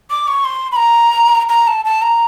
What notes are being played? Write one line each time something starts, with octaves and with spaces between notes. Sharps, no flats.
D6
C#6
C6
B5
A#5
A#5
A5
A5
A#5